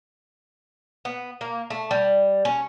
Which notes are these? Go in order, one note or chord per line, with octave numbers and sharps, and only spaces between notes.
B3
A#3
A3
G3
C#4